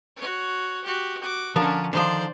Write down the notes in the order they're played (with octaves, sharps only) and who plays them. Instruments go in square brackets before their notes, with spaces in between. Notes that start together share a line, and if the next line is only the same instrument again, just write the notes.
[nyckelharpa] F#4 C#5
F#4 G4
F#4 D6
[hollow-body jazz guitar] D3 F3 A#4 [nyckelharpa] C#4 D4
[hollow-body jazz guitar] D3 D#3 F3 [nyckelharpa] C5 D5